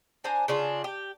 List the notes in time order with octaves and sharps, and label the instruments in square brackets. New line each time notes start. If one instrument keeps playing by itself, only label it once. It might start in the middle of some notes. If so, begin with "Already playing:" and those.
[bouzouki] D4 C5 G#5 A#5
C#3 D4 F4
G4